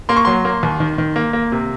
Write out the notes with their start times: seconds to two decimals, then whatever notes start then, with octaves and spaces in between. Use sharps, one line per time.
0.09 A#3 C6
0.17 C#6
0.25 F#3 C6
0.45 A#3
0.63 D#2
0.80 D#3
0.98 D#3
1.16 A#3
1.33 A#3
1.52 C3